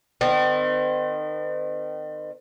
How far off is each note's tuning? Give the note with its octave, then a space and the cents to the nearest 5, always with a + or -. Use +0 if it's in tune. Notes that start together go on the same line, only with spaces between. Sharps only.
D#3 -30 C4 -40